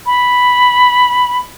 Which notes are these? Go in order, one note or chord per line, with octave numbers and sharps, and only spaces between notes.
B5